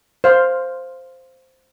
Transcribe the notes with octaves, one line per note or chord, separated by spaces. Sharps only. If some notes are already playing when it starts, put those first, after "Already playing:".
C5 F5